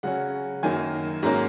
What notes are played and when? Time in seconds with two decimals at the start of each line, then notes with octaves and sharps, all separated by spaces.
0.03 C#3 F#3 C#4 F#5
0.63 F#2 D#3 F#3 A#3 G#5
1.23 G#2 F#3 A#3 C#4 A#5